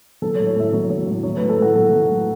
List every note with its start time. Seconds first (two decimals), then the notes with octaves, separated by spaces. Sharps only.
0.22 F#3 A4
0.35 C#5
0.39 A2
0.47 C#5
0.56 A2 E5
0.73 F#3 C#5
0.90 F#3 C#5
1.07 A2
1.23 F#3 C#5
1.37 A2 B4
1.49 A4
1.58 A2 F#4
1.75 F#3 A4
1.92 F#3
2.09 A2